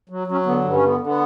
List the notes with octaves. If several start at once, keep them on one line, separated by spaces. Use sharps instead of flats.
F#3
F#3 C#4
D3 B3
G2
C#4
D3 B3
D3
B3